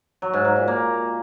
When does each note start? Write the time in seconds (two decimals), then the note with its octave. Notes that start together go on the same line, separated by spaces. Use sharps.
0.22 F#3
0.33 G#2
0.45 G#2
0.56 A#2
0.68 A#3